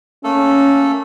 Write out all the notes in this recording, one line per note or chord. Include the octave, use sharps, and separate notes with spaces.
A3 A#3 C#4 A4